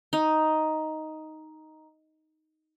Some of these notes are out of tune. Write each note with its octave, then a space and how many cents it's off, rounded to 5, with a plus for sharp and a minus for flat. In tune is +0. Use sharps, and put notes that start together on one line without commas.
D#4 +5